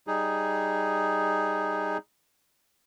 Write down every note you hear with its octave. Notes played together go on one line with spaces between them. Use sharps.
G3 D#4 G#4